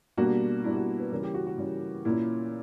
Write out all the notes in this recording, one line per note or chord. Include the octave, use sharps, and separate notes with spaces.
B2 G3 A#3 D4 F#4
B2 G3 A#3 D4 E4
F#4
B4
C#3 E3 G3 A#4
G4
F#4
F#4
C#3 E3 G3
A#2 A#3 C#4 E4